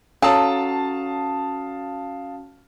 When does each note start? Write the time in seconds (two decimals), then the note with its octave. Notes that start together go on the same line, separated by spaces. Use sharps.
0.22 F#3 C#4 F#4 A4 F5 A5 D#6